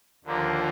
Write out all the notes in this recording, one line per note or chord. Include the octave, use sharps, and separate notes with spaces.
D#2 D3 F3 A#3